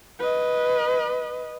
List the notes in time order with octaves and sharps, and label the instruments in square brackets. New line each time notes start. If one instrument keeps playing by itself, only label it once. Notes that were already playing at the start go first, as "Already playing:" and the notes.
[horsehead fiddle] B4 D#5